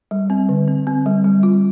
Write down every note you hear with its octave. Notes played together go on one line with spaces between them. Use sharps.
G3
C4
D3
C4
C4
G3
G3
F4